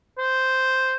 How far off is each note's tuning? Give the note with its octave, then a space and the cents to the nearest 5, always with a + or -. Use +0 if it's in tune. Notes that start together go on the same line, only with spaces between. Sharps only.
C5 -5